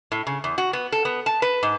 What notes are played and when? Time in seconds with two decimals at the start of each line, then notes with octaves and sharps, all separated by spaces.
0.12 A2
0.27 C#3
0.44 E2
0.58 F#4
0.73 B3
0.92 A4
1.05 B3
1.26 A5
1.42 B4
1.63 G#2